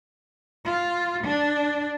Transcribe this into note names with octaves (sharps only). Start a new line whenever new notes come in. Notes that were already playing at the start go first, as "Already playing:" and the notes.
F4
D4